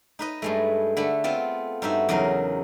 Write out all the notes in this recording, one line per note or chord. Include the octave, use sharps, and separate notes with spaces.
D#4 B4 D#5
G2 G#3 A3
D3 A3 B5
B3 C4 F4
G2 D#4 F#4 E5
E2 C#3 F#3 D#4 A#4